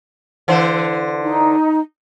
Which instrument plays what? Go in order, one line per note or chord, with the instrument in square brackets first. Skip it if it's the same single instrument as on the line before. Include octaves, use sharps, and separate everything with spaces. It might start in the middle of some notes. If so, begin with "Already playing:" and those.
[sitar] D3 E3 C5
[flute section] D#4